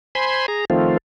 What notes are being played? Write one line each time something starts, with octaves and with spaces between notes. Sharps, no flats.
C5 G#5 B5 C6
G#4 A#5
D#3 F3 A3 C4 F4